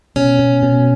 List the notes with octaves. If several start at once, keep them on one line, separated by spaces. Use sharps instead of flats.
B2 C#4
B2
B2